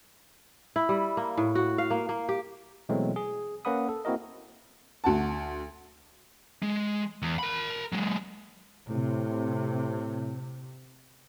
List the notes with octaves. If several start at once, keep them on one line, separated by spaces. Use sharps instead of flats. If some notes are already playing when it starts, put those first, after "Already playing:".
E4
G3
A#3
A2
F#4
F5
A#3
A#3
G4
B2 E3 F#3 G#3 A3 C4
G#4
A#3 C#4 B4 F#5 B5 D#6
A4
A#3 C4 E4 F#4 A#4 D#5
D2 F#4 A5
G#3
E2
A#4 B5
F#3 G#3
A2 C3